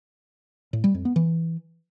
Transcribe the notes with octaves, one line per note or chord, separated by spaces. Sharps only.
A2
G3
F2
B3
E3